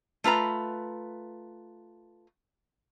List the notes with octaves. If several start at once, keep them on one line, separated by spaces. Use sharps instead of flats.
A3 F4 B4 A#5